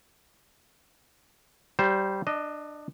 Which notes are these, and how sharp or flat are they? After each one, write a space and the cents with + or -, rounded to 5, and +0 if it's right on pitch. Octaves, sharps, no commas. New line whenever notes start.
G3 -15 C5 +5
D4 +20 D#5 +0